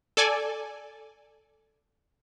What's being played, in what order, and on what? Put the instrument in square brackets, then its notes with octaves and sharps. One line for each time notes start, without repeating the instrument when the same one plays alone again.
[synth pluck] A4 D5 G#5